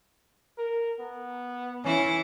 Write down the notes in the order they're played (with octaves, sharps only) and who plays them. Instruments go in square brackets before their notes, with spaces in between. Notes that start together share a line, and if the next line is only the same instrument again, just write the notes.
[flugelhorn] A#4
B3
[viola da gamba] E3 E4 [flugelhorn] C#4